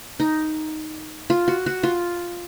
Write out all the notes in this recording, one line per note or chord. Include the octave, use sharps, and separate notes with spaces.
D#4
F4
F#4
F#4
F4